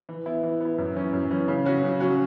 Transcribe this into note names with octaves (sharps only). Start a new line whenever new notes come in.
E3
B3 E4
E3
B3 E4
F#2
E3 C#4
F#2
E3 C#4
C#3
F#3 C#4 F#4
C#3
F#3 C#4 F#4